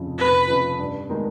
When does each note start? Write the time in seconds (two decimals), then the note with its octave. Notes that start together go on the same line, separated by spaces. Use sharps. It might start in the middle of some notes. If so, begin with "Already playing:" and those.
Already playing: F1 F2 C#3 F3
0.18 F1 B4
0.48 F2 C#3 F3
0.79 G2
1.10 D#3 G#3 B3 D#4